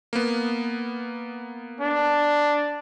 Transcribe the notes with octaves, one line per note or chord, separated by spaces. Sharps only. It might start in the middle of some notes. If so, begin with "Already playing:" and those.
A#3 B3
D4